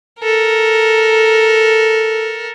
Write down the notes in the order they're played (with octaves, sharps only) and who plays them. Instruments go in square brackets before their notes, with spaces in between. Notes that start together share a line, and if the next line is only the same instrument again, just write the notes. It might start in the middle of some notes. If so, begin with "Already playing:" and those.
[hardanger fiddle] A4 A#4